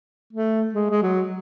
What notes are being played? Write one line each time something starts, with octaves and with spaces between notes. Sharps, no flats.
A3
G#3
G#3
F#3